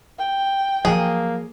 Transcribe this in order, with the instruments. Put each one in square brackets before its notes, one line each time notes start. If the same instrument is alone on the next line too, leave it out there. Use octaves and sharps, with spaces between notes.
[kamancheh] G5
[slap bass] F3 F#3 [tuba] A#3 [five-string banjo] G#4